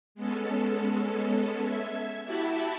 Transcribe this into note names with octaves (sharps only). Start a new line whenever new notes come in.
G#3 B3 C#4 A4
E5 G#6
E4 F#4 G4 E5 A5 B5